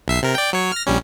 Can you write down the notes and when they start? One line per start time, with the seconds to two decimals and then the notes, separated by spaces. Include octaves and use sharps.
0.08 B1 E5 C7
0.23 C3 A#4
0.35 D5 G5
0.53 F#3 C#5
0.72 F6 A#6
0.86 A#1 G3 C#4